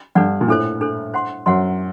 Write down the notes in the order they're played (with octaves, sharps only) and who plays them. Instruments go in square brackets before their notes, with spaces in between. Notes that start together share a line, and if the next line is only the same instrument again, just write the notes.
[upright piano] G2 [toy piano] D4 A4 D5 F#5
[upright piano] A#2
[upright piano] A2 [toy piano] D4 A4 C5
[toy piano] D4 A4 C5
C5 F#5 C6
[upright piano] F#2 [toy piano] C5 F#5 C6